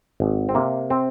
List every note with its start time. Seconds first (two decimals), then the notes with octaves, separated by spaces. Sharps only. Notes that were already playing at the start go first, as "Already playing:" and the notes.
0.20 G#1
0.49 C4
0.55 C3 A#3
0.90 C4